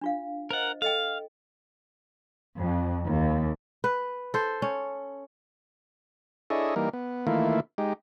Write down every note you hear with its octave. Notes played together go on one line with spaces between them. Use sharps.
D4 F4 F5
A#4 C5 D#5 F#5
A4 D#5 F5 G5
F2
D#2
B4
A4 C5
C#4
D4 E4 G#4 A4 C#5 D#5
E3 G3 A#3 D#4 A#4
B3
D#3 E3 A3 A#3 E4 F4
G#3 D#4 G4